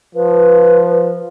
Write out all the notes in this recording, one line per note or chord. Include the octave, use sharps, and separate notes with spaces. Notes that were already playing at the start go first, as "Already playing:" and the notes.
F3 B4